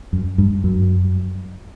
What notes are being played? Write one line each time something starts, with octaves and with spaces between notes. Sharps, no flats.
F#2
G2
F#2